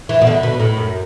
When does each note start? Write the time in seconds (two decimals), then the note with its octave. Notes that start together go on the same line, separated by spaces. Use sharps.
0.09 E3
0.21 B2
0.27 D3
0.43 B2
0.60 A2
0.77 F#2